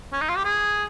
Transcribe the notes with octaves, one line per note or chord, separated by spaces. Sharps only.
C#4
D#4
F4
G4
G#4